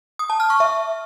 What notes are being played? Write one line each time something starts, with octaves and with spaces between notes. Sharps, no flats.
D#6
A5
F6
C#6
E5